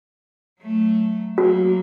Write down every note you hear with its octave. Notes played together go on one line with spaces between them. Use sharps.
F#3 A3
F#3 A#3 F#4